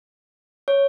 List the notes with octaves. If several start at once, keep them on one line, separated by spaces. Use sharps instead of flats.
C#5